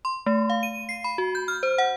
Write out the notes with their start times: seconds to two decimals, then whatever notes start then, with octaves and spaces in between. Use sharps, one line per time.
0.05 C6
0.26 A3
0.50 F5
0.63 D#7
0.89 C7
1.04 B5
1.18 F#4
1.35 G6
1.48 F6
1.63 C5
1.78 F#5